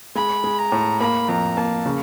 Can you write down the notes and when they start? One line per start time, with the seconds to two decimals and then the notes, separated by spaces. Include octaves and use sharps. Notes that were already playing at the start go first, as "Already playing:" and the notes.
0.15 G#3 B5
0.44 G#3
0.58 A#5
0.72 A2
1.00 A#3 B5
1.28 F2 A#5
1.57 A#3 A5
1.86 C#3